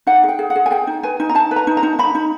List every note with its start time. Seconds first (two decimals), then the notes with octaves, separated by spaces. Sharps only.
0.07 D#4 F#5
0.23 G#4
0.29 G5
0.39 G#4
0.50 F#5
0.55 G#4
0.66 G#5
0.71 G#4 G5
0.87 D#4
1.03 B4 G#5
1.20 D#4
1.29 A#5
1.35 D#4 A5
1.51 B4
1.56 A#5
1.67 D#4
1.77 A#5
1.83 D#4
1.99 D#4 B5
2.15 D#4